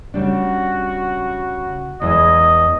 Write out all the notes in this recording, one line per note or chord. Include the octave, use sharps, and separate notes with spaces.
C#3 G3 D4 F#4
E2 E3 G#3 D#5